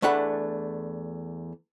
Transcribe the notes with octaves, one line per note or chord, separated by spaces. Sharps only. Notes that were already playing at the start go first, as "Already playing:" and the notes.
E2 A3 D4 F#5 B5